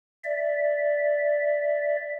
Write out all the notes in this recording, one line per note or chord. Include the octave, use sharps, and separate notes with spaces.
D5 E5